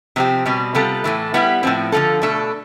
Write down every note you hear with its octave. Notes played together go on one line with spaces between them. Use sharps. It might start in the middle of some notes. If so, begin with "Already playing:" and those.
C3 F3 C4 G4
B2 G3 C4
C3 G3 B3 F4 A4
A2 E3 A3
G3 B3 E4 G4
A2 F3 C4
D3 F3 C4 F4 A4
B2 A3 D4 A4